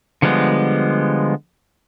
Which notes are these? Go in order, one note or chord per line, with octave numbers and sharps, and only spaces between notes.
D3 F3 G3 G#3 B3